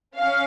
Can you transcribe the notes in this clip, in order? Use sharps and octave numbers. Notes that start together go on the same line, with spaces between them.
C#4 F5